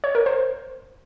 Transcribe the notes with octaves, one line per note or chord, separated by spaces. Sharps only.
C#5
A#4
C5